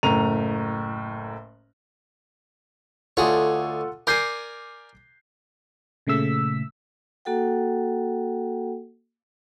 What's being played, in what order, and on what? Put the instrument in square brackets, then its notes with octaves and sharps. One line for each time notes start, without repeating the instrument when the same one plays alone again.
[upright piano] F#1 A2 A#5 D#7 F7
[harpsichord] D2 G#4 C#5 [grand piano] F4 A4 F#5
[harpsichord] A#4 D5 G#5 [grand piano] D6 G6 C7
[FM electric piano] A#2 C#3 A3 E6 B6
[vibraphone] A#3 F#4 A4 F#5 G5